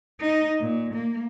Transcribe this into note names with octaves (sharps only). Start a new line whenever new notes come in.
D#4
A#2
A#3